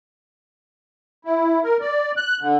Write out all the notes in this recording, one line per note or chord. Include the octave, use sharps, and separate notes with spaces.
E4
A#4
D5
F#6
D3